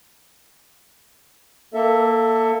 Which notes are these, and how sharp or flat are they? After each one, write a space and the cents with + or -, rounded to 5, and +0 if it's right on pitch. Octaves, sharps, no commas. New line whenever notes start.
A#3 +0 A4 +20 E5 +0